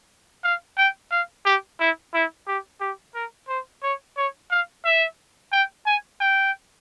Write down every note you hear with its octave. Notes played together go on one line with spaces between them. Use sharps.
F5
G5
F5
G4
E4
E4
G4
G4
A#4
C5
C#5
C#5
F5
E5
G5
G#5
G5